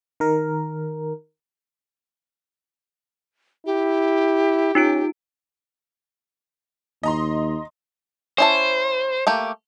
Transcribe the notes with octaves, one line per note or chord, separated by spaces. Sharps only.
D#3 A#4
E4 G4
C#4 D#4 F4 D7
D#2 D#5 A#5 C6
C#4 E4 C5 A5
A3 A#3 G4